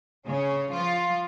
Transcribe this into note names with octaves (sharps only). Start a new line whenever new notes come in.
C#3 C#4
F3 F4